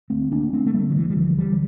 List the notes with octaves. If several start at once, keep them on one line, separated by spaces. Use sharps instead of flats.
D2 A3 C4
D2 A#3 D4
D2 A3 C4
A3
D3 G3 A#3
F3
D2 E3
G3
D2 D3 F3
D3 E3 G3